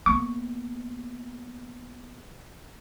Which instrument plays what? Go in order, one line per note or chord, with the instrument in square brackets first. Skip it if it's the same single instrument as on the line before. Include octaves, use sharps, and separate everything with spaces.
[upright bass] A#3 B3 [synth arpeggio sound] C#6